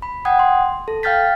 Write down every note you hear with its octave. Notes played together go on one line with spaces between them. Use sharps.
B5
F#5 G5 D#6 G#6
C6
A4
F5 G5 F6 G6 A6 B6